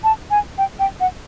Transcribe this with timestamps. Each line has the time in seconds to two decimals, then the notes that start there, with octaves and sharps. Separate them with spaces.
0.04 A5
0.30 G#5
0.58 G5
0.79 G5
1.00 F#5